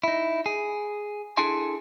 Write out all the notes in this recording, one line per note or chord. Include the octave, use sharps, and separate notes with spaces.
D#4 E4
G#4
D4 E4 G#4 A4 G#5 C6